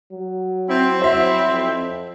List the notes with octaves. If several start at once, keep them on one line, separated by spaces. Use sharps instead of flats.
F#3
C4 E4
F#3 C5 E5
F2